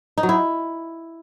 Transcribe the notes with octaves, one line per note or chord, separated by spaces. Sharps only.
D#4
F#3
E4